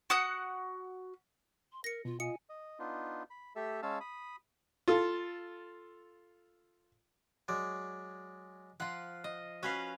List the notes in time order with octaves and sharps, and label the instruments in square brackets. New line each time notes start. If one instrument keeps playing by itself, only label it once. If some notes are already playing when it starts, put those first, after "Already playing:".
[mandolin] F#4 F#5 D#6 F#6
[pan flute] C6
[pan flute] A#4 [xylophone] A#6 C#7
[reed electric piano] B2 [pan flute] F4
[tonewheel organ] F4 D#5 [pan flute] G#5 [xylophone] C#7
[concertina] D#5
B3 D4 D#4 F4
B5
A3 G4 A4 E5 E6
G#3 C#4 F5 A5 E6
B5 D#6
[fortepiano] F4 A4
[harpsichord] F#3 G#3 D5
[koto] F3 F4 [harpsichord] F#5
[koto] D#5
[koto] C#4 B4 F5 [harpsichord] F#4